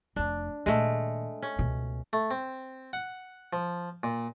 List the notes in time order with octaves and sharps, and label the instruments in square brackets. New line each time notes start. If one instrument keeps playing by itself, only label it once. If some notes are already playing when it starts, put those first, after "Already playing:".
[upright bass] F1 F2 [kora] D4
[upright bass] A#2 D#3 [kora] G#3 A3
[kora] C#4
[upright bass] C#2 B2
[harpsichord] A3
C4
F#5
F3
A#2